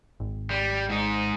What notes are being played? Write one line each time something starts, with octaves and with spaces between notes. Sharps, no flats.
G#1
G3
G#2 D#4